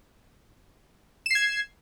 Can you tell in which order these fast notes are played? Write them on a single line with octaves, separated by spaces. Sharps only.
E7 C7 G#6